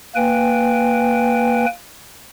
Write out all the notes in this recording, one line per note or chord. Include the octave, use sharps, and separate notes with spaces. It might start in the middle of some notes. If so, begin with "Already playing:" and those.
A#3 B4 G5 G#5